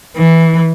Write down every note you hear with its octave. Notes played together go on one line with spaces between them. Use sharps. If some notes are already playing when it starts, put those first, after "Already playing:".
E3